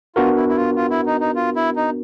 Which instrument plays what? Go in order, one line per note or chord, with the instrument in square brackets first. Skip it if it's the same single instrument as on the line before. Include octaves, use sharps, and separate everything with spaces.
[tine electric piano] B3 D4 F#4 A#4 [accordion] F4
[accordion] E4
E4
F4
F4
E4
D#4
D#4
F4
E4
D#4